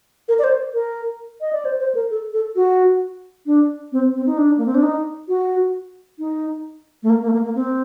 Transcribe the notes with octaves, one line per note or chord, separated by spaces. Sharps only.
A#4
D5
C5
A#4
D#5
D5
C5
C5
A#4
A4
A4
F#4
D4
C4
C4
D#4
D4
A#3
C4
D4
D#4
F#4
D#4
A3
A#3
A#3
A3
A#3
A#3
C4